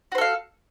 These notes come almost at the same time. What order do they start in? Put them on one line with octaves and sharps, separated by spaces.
F#4 C5 A4 F5